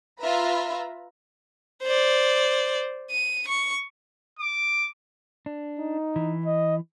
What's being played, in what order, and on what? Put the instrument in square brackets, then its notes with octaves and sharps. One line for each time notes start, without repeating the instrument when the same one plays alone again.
[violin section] F4 B4 E5 A#5 B5
[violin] C5 D5
D#7
C#6
[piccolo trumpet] D6
[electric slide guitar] D4
[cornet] D#4
[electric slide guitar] E3
[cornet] D#5